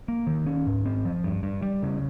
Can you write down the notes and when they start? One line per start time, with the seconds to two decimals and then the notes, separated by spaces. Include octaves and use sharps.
0.08 A#3
0.27 D#3
0.47 C#4
0.67 G#2
0.86 C4
1.05 F3
1.24 G2
1.43 G2
1.62 G3
1.83 C#3